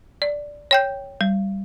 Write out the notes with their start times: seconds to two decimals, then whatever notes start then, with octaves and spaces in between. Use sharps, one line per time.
0.22 D5
0.71 C#5 G5 G6
1.21 G3